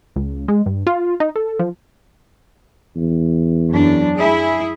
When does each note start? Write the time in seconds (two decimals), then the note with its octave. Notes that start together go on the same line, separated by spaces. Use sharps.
0.16 C#2
0.48 G#3
0.66 G2
0.87 F4
1.20 D#4
1.36 A4
1.59 F3
2.96 E2
3.68 F#2 D4
4.17 E4 G#4